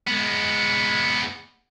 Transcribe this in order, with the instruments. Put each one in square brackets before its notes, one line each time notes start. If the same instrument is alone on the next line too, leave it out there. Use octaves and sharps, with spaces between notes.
[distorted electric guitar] G#3 B3